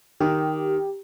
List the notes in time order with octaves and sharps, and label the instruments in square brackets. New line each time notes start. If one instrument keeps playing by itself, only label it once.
[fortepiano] D#3 [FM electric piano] G4